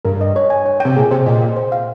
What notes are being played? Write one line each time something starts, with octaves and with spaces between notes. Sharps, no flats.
G2 A#4
D#5
C#5
G#5
C#5
C3 G5
A#2 G#4
C3 C5
A#2 D#5
G5
C5
F5